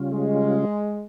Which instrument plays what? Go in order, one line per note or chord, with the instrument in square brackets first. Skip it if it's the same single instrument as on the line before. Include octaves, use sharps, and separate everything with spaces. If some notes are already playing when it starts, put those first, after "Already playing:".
Already playing: [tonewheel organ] C#3 G3 C#4 F4
[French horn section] G#3